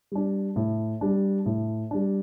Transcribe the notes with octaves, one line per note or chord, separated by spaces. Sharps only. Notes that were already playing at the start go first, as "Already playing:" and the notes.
G3 D4
A2
G3 D4
A2
G3 D4